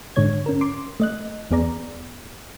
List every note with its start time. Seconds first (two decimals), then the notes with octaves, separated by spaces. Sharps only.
0.16 G#2 D3 G#3 C#5 G#6
0.46 C#4 A#4
0.61 C6 D6
1.00 A3 D#5 F#6
1.51 E2 B3 G#4 D5 A#5